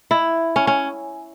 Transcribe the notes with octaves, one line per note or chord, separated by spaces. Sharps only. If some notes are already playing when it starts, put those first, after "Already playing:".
E4
C#4
C#4